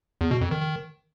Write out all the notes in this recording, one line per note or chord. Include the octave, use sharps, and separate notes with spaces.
E2
B2
F2
D#3
D#3